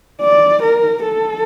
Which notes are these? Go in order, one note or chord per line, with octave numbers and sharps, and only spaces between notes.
D5
A#4
A4